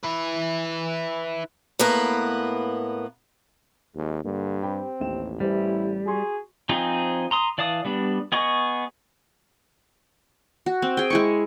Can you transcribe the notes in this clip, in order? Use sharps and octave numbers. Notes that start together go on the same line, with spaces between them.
E4 B4
A2 A#3 B3 B4
D#2 G#3
G2 D3 A#3
C4 G4 G5 B5
A1 D#2 E7
E3 G3 E4 C5 E5
F#4 G#4 C6 C#6
F3 C4 D#4 G#4
A#5 C6 D#6
E3 D5 F5 A5 D#6
G3 B3 D4
B3 G#4 D#5 C#6
F#4
C4
G#4 G5
G#3 E4 C#6